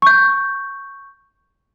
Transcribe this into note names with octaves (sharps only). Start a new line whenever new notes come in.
C#6 G6